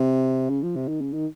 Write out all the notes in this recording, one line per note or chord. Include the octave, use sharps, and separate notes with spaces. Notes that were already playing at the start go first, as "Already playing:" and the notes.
Already playing: C3
C#3
F3
C3
D#3
C#3
D#3